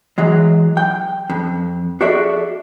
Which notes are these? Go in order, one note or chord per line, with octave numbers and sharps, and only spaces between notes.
E3 F#3 G#3
G5
F2
F#4 G#4 A4 D5 E5